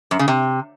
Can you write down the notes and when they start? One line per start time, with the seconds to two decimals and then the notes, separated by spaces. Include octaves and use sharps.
0.11 F#2
0.19 C#3
0.28 C3